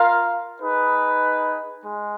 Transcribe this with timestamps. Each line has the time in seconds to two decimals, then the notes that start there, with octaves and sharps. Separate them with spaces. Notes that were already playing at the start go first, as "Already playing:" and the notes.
Already playing: F4 A#4 F5
0.62 D#4 G#4 B4
1.86 G#3